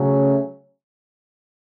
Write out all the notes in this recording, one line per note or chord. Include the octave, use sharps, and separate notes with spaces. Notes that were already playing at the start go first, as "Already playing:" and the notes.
Already playing: C#3 F#3 A3 C#4